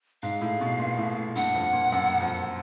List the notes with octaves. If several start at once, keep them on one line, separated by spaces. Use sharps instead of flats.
G#2 F5
A2
B2
A#2
A2
A2
G2 F#5
F2
A#2
F#2
F2